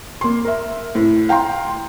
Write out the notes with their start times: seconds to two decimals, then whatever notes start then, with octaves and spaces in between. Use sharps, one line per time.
0.21 A#3 C6
0.45 A#4 E5
0.95 A2
1.29 F5 G5 A#5 C6